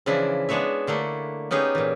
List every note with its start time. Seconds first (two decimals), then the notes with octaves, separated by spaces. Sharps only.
0.06 C#3 E3 F3 D4 E4
0.49 G#3 B3 D4 C#5 E5
0.87 D3 A3 A#3 E4
1.51 B3 C#4 D#4 G4 G#4
1.75 A#2 E3